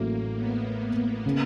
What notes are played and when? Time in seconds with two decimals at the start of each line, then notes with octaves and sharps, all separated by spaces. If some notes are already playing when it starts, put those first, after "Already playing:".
Already playing: A1 A2 F#3 A3 A#3
0.37 B3
1.26 C#3